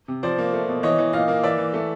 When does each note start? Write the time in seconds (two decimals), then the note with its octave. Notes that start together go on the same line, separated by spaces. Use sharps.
0.08 C3
0.23 F3 C5 D5
0.38 A#3
0.53 A3
0.68 B2
0.83 E3 C#5 D#5
0.98 E3
1.13 A#2 D#5 F5
1.28 A#3
1.43 E3 D5 E5
1.58 E3
1.74 A3